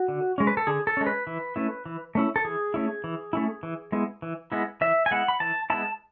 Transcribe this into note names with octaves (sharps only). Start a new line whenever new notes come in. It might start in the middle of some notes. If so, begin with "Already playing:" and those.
Already playing: F#4
D3
G#3 C#4
B4
A4
D3 G#4
A4
G#3 C#4
B4
E3
A3 C#4 E4
E3
A3 C#4 E4
A4
E3 G#4
A3 C#4 E4
E3
A3 C#4 E4
E3
G#3 B3 E4
E3
G#3 B3 E4
E3 E5
G#5
G#3 B3 E4 F#5
B5
E3 A5
G#3 B3 E4 A5